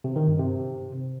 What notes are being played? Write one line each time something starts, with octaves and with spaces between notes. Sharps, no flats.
C3
D#3
G2
C3